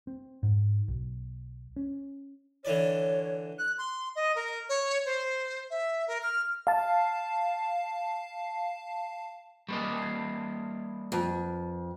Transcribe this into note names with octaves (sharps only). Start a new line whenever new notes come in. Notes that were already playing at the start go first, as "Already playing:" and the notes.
C4
G#2
B1
C#4
D3 E3 C#5 D5
F#6
C6
D#5
A#4
C#5
C5
E5
A#4
F6
F5 A5
G3 A#3 D#5 C#6
G#6 C7
F2 B4 A5